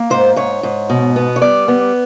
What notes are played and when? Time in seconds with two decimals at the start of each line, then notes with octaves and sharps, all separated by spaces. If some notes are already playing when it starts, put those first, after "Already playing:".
Already playing: A#3
0.10 G#2 C5
0.36 G#2 C#5
0.63 G#2
0.90 B2
1.16 B3
1.36 C#5
1.42 G3 D5
1.68 B3